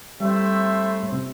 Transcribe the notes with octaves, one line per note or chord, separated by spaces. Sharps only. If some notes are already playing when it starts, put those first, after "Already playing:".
G3 A3 C4 E4 C5 E5
A2
C3